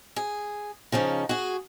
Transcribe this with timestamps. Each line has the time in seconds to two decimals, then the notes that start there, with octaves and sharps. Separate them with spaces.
0.16 G#4
0.92 C#3 F3 C#4 D#4
1.29 F#4 G#4